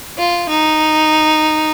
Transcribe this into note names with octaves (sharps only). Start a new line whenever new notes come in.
F4
D#4